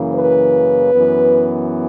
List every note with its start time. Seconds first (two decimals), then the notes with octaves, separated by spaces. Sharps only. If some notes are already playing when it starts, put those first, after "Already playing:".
Already playing: F#2 C#3 E3 A#3
0.13 B4
0.93 F#2 E3 B3